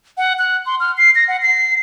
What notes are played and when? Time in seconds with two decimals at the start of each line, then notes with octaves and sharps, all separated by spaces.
0.17 F#5
0.39 F#6
0.66 C6
0.80 F6
0.97 C7
1.15 A#6
1.28 F#5
1.42 C7